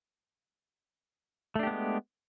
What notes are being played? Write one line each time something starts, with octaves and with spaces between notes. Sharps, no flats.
G#3 A3 B3 D4 G4